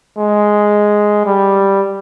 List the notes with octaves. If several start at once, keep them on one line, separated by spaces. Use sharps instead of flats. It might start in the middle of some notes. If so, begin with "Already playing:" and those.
G#3
G3